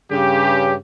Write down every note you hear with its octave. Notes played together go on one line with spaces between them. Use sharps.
G2 C#3 G4